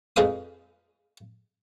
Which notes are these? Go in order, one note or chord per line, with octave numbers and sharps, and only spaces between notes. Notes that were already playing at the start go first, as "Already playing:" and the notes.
F2 D#4 G#4 B4 F5 D#6